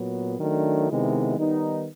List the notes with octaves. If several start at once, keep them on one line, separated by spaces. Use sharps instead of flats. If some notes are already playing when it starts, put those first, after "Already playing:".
Already playing: A#2 F#3 B3
D#3 F#3 A3 D4
C3 D#3 G#3 B3 E4
D#3 G3 B3 D#4